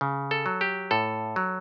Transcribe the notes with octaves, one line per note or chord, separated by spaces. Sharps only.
C#3
A4
F#3
G4
A2 A4
F#3